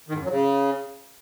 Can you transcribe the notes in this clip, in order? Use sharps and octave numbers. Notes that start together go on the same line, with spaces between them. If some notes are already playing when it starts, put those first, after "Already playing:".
D#3
G#2
F#2
F#3
C#3